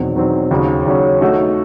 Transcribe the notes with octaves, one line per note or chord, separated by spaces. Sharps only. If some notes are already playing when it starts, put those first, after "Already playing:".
Already playing: E1 E2 D#3 F#3 C4
E1 E2 D#3 F#3 C4
D#2 C#3 F#3 C#4
D#2 C#3 F#3 C#4
D#3 A3 D#4 F#4 C#5